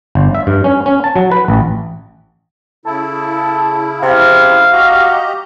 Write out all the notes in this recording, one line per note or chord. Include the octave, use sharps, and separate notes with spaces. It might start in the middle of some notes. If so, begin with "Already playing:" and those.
G1
E5
G2
C#4
C#4
A5
F#3
B4
A1
C#3 E4 A4
C3 F5
F#4 G4 D#5 A#5